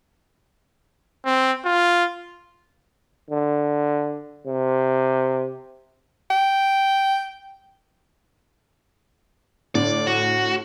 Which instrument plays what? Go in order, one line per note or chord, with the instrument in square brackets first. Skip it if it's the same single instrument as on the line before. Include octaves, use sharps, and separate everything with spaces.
[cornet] C4
F4
[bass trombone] D3
C3
[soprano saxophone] G5
[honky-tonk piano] A2 D3 [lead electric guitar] D5
[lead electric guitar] F#4